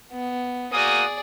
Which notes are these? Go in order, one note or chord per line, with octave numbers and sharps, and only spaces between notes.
B3
A#3 F#4 G#4 D5 D#6